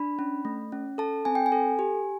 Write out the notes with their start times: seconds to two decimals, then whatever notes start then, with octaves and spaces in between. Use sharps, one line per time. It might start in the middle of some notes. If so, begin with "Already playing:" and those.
Already playing: D4 B5
0.19 C#4
0.45 A3
0.72 C#4
0.98 A4 A5
1.25 C4 G#5
1.35 G5
1.46 G#5
1.52 A4
1.79 G4